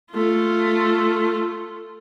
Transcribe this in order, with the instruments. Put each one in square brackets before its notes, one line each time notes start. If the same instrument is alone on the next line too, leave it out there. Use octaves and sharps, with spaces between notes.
[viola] A3 F4